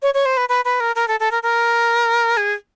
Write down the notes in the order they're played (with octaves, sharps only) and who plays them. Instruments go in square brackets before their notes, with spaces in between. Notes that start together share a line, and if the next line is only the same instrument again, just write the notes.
[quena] C#5
C#5
C5
B4
B4
B4
A#4
A#4
A4
A4
A#4
A#4
G#4